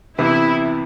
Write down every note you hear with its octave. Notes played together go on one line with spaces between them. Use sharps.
C3 E3 B3 E4